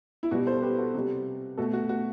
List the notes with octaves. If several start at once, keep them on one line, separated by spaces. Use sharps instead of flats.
E4
B2 G3 F#4
A4 C5
G4 B4
F#4 A4
C3 G3
B2 A3 F#4 A4
F#4
F#4